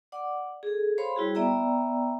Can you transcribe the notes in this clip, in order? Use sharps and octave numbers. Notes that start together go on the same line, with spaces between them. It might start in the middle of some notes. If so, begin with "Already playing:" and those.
D5 F#5 D6
G#4 A4
C5 C#5 F5 B5 C6
G3 E4 F#4 G#4
B3 D5 E5 G5 A#5 E6